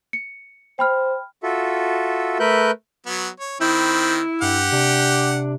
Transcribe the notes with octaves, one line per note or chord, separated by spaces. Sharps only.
C#7
C5 G5 B5 F6
F4 F#4 A4 E5
A3 A#4 B4 E5 F#6 G6
F#3 B3
C#5
D#3 C4 E4 B5 G6
G2 G4 F#5
C3 D4